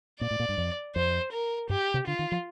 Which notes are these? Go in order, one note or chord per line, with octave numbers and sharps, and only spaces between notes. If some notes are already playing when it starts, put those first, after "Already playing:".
A#2 D5
A2
A#2
G2
F2
F2 C5
A#4
G2 G4
C3
D3 F4
D#3
F3